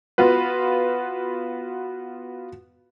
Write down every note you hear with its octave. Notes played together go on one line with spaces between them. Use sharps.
B3 F4 F#4 B4